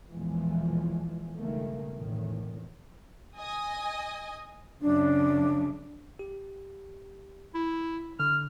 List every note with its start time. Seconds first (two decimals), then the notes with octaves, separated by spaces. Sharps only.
0.11 B1 E2 A#2 E3 F3 G#3
1.38 C#2 G2 B2 D#3 A3 A#3
1.95 F1 A#1 E2 A2 D#3
3.37 D#5 G#5 D#6
4.81 F#2 C#3 D4
6.19 G4
7.55 E4
8.20 D3 F6